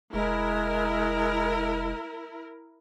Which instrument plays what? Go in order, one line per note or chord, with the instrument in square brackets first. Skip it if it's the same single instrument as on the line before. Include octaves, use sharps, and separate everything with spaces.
[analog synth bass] F1 [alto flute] G#3 [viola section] E4 A#4